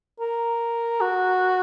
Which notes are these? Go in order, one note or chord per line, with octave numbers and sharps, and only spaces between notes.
A#4
F#4